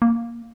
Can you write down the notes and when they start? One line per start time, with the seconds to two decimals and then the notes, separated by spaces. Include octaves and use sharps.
0.02 A#3